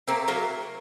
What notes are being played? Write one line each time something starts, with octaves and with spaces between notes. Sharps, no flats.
A3 A#3 C4
F#3 A#3